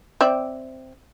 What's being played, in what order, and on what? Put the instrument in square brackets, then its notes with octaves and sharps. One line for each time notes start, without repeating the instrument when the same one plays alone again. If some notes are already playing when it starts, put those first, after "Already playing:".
[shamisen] C4 D5 E5